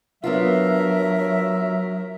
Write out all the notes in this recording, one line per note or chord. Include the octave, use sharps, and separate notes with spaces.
F#3 B3 D4 F4 A#4 E5